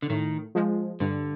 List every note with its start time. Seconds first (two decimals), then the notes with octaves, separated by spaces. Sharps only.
0.02 D3
0.10 A2 D#3
0.55 F3 G#3
1.00 G2 D3